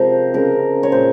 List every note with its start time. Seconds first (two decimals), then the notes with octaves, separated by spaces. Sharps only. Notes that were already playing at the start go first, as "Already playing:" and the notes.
Already playing: C3 F3 G#3 A#4 C5
0.34 C#3 G#3 A#4
0.83 C#5
0.92 A#2 G#3 C5